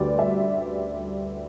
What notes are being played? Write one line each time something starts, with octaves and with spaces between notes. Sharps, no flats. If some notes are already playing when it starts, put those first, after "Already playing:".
Already playing: D2 D3 G3 B4 D5
E5